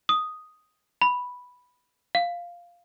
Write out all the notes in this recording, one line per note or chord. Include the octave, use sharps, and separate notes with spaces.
D#6
B5
F5